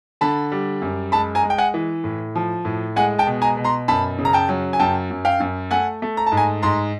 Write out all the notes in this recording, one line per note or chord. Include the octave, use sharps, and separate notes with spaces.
D3 A5 B5
G3
F#2
G#3 A5 B5
G#5 A#5
G#3
G5
F#5 G#5
E3
A2
F3
A2
G#3 F#5 G#5
G5 A5
B2
G#5 A#5
B2
A#5 C6
F#2 A5 B5
C#3
A#5
G5 A5
F#3
G#5
F#2 G5 A5
F#2
F5 G5
F#2
A3 F#5 G#5
A3
A#5
A5
G#2
G#5 A#5
G#2 A#5 C6